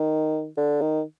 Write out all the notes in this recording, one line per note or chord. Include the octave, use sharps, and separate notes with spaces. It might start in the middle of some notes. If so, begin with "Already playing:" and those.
Already playing: D#3
D3
D#3